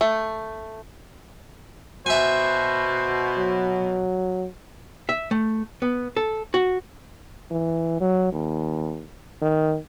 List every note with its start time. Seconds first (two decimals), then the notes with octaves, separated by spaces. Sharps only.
0.01 A3
2.06 B2 C5 E5 G#5
3.38 F#3
5.09 E5
5.31 A3
5.82 B3
6.16 A4
6.54 F#4
7.51 E3
8.01 F#3
8.32 D#2
9.42 D#3